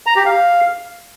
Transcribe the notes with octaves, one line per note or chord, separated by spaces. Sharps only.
A#5
G4
F5